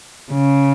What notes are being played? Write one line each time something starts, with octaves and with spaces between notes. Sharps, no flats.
C#3